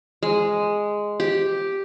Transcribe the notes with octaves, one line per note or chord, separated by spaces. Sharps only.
G#3
G4